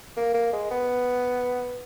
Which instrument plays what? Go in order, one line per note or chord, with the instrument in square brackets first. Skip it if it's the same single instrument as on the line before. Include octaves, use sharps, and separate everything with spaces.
[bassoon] A#3
A#3
G#3
B3